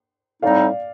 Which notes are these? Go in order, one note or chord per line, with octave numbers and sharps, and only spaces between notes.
A2 G3 C4 D#4 D5 F5